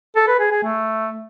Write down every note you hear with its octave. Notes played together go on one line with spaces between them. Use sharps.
A4
B4
G#4
G#4
A3